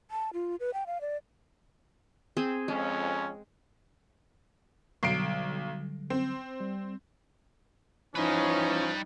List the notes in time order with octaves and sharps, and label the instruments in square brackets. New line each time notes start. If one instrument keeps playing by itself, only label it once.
[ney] A5
F4
B4
G5
F5
D5
[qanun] C4 G#4
[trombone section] F2 C#4 [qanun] G#3
[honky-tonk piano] B1 C7 D7 [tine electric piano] D3 F#3 G3
[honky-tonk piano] C4
[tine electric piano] G3
[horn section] E3 F3 C#4 [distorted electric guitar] G3 B4 [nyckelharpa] D#4